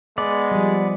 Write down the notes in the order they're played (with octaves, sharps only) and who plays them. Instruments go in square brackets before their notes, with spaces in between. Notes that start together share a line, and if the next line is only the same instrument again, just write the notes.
[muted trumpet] G#3 [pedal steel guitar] B3 D5
[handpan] F3 G3